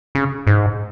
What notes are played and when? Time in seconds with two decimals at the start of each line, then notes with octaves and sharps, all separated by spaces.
0.15 C#3
0.47 G#2